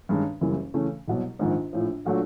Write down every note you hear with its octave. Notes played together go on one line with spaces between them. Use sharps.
G2 D#3 G#3 C#4
F#1 F#2 C#3 E3 G3
C#3 E3 A3 C#4
C2 B2 F#3
A#1 G#2 D#3
A#1 A2 F3
A#2 F#3 A3 D4 F#4